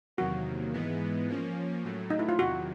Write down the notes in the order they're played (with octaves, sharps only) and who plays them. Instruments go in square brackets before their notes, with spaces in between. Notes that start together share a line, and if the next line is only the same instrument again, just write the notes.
[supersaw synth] E2 C3 D#3 F#3 A#3 [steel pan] F#4
[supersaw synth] G#2 E3 G#3 B3
F3 A#3 C#4
A2 F#3 A3
[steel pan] D#4
E4
F4
[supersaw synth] E2 C3 D#3 F#3 [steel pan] F#4